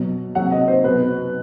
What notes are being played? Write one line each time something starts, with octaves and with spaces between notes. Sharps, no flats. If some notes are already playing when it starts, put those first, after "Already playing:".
Already playing: B2 F#3
C3 F#3 F#5
D#5
C5
B2 F#3 B4